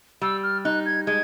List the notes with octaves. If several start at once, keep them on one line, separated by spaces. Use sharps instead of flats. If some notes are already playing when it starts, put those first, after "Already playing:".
G3 E6
F6
D#4 F#6
G#6
G#3 G#6